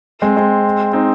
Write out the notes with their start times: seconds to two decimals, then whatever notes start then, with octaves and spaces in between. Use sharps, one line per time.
0.22 G#3 C4
0.36 G#3 C4
0.93 C4 D#4